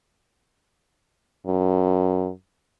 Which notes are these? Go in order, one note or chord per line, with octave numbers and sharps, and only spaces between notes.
F#2